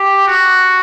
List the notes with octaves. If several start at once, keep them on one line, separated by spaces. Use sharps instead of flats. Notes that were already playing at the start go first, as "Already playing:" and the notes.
Already playing: G4
F#4